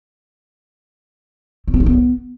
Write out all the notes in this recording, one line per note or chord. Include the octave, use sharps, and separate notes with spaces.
C4
B3
D#4
B3